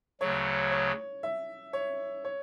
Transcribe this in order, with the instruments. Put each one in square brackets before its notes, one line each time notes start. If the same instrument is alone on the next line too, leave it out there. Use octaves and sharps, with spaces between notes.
[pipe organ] D2 C#3 F#3 [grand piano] C#5
[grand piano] C#5
E5
C#5
C#5